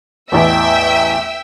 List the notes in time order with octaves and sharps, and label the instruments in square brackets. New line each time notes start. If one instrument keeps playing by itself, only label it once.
[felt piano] A1 E2 [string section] E5 G5 E6